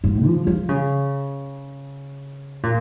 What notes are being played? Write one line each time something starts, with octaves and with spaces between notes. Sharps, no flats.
G#2
F3
F3
C#3
A#2